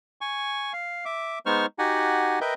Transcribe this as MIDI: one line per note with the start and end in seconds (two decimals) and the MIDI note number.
0.21 0.73 80
0.21 0.73 85
0.73 1.05 77
1.05 1.39 76
1.05 1.39 86
1.46 1.66 56
1.46 1.66 59
1.46 1.66 63
1.46 1.66 72
1.46 1.66 85
1.46 1.66 89
1.79 2.39 63
1.79 2.39 66
1.79 2.39 67
1.79 2.39 78
1.79 2.39 80
2.41 2.54 70
2.41 2.54 71
2.41 2.54 75
2.41 2.54 76
2.41 2.54 79